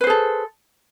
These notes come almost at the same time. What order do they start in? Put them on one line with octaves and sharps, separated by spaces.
B4 C5 G#4 A4